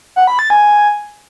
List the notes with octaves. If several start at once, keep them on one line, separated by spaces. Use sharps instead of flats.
F#5
B5
A6
G#5